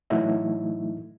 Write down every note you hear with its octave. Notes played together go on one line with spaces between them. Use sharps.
A2 E3 F#3 A3 D#4 E4